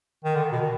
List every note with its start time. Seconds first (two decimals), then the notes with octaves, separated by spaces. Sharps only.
0.24 D#3
0.35 D3
0.52 B2
0.62 D#3